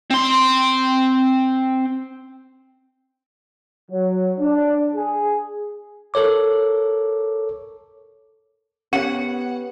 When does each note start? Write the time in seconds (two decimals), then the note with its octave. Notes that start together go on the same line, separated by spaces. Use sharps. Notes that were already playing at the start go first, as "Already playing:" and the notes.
0.10 C4 C6
3.91 F#3
4.40 D4
4.95 G#4
6.14 A4 A#4 C#5 D6
8.93 B3 C#4 G4 C#5 F#5